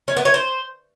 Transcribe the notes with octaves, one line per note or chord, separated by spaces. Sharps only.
C#4
B3
C#5
C5